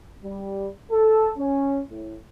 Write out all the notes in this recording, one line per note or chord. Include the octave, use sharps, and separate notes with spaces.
G3
A4
C#4
A2